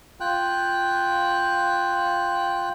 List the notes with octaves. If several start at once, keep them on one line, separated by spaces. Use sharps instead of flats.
F4 G5 F#6